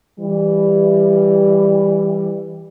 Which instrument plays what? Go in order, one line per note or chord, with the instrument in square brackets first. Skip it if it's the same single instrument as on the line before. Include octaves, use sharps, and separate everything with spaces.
[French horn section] E3 G3